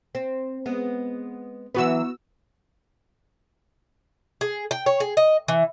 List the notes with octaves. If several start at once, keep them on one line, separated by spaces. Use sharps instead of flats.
C4
G#3 B3
E3 F#3 B3 F#4 B4 E6
G#4
G5
C#5
G#4
D#5
E3